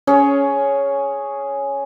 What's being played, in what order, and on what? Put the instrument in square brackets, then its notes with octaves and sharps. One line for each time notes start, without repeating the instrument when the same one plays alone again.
[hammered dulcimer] C#4 G#4 C#5